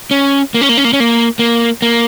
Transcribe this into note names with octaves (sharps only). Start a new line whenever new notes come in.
C#4
A#3
C#4
A#3
C#4
A#3
C#4
A#3
A#3
A#3